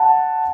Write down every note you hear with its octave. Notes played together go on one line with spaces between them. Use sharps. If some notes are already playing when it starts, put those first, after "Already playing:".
Already playing: F#5 A5